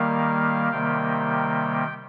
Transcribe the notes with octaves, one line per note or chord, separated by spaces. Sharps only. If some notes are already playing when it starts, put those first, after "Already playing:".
Already playing: D#3 G3 A#3 F5
C3 D#3 G3 A#3 G5